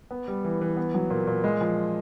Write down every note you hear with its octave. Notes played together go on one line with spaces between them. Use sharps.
B3
G3
E3
E3
B3
F#3
A#2
A#2
G#3
F3